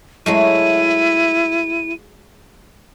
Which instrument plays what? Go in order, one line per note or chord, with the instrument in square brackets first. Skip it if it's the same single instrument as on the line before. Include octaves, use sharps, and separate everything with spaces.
[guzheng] F#3 G#3 A3 [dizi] E4 [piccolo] D#7